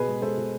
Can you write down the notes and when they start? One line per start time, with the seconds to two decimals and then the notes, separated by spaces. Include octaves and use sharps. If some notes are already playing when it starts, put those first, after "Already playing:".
Already playing: B2 G#4 B4
0.08 G#3
0.22 G#3 A4 C5
0.37 B2